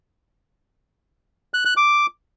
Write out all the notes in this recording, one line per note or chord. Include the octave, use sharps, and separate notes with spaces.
F#6
F#6
D6